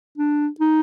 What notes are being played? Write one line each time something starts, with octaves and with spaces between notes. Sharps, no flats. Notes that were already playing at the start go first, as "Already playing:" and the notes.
D4
D#4